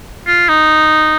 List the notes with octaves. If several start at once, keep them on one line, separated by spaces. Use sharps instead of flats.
F4
D#4